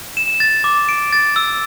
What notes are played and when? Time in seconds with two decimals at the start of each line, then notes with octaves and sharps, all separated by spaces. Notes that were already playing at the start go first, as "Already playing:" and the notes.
0.17 E7
0.40 A6
0.64 D6
0.89 D7
1.13 A6
1.36 E6